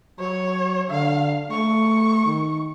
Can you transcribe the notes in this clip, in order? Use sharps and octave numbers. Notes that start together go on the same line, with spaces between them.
F#3 C#5
D3 F5
A3 C#6
D#3